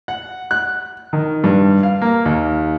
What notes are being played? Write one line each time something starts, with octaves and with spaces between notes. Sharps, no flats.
F#5
F#6
D#3
G2
F5
A#3
D#2